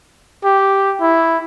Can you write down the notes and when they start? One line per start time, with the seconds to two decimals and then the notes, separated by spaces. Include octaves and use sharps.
0.44 G4
1.01 E4